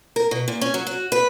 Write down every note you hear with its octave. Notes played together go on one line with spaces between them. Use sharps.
A#4
B2
A#2
C#4
F#3
F#4
B4